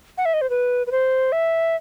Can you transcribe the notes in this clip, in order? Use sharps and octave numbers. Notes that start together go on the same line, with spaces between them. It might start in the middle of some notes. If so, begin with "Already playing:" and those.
F#5
E5
D#5
C5
B4
B4
C5
E5